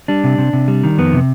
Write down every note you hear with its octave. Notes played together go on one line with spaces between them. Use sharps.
G3 D4
C3
C3
C3
G3
D#3
F2 B3
C3